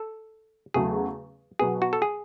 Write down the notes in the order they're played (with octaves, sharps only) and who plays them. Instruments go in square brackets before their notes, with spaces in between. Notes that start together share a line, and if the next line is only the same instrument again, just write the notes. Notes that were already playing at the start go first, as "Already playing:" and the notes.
Already playing: [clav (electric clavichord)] A4
[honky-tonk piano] E2 C#3 F#3 A3 [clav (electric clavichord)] G#4
[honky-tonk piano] B2 F#3 B3 [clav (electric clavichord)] G#4
[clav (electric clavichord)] F#4
A4
G#4